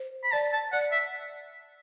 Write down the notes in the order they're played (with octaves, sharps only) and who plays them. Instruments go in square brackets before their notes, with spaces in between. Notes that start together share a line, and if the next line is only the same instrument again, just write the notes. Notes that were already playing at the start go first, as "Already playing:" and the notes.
Already playing: [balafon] C5
[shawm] B5
[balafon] D5 [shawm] A5
[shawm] A5
[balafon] D5 [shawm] F#5
[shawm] E5